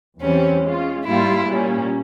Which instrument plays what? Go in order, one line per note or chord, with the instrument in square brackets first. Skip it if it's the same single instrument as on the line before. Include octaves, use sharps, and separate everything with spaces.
[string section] E2 E3 G3 C4 [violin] C#4
[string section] G#3 C#4 F4
[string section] G#2 G3 A#3 F4 [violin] E4
[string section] A#2 G3 A#3 C#4